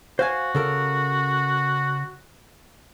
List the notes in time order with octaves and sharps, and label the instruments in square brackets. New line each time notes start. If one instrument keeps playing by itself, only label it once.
[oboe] F#4 [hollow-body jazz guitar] C5 F5 G#5
[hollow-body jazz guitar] C#3 A4 A#4